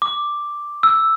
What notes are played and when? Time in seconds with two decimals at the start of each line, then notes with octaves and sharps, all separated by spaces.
0.02 D6
0.83 E6